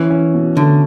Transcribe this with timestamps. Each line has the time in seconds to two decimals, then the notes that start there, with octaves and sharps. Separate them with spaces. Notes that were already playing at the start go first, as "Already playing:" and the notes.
Already playing: E3 C#4
0.10 C#4
0.34 B2
0.57 D3 A3